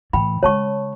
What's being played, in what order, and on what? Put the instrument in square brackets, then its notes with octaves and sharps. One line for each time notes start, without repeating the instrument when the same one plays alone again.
[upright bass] A2 E3 [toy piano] G5 B5
[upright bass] C#3 G#3 [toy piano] C#5 A5 C#6